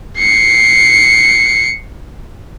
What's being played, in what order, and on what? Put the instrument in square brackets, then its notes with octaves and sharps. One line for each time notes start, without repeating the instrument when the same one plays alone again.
[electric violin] C7 C#7